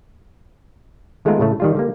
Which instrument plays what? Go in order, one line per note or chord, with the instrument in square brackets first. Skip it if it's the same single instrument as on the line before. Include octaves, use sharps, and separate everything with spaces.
[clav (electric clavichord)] D#3 G#3 A3 B3 F4 A#4
A2 C#3 A3
D#3 G3 F4
D3 G3 A#3